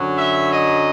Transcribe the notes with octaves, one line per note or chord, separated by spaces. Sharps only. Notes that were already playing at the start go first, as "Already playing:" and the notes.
Already playing: F#2 D3 F#3
E5
D#5